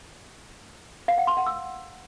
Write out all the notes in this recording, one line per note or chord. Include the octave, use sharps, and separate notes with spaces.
F5
F#5
C6
F#5
E6